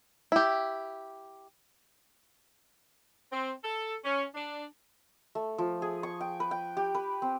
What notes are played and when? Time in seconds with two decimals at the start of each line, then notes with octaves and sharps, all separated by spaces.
0.32 E4 G4
3.32 C4
3.64 A4
4.04 C#4
4.35 D4
5.35 A3
5.58 F3
5.82 G#4
6.03 C#6
6.21 G5
6.40 B4
6.51 G5
6.77 G4
6.95 B4
7.22 C4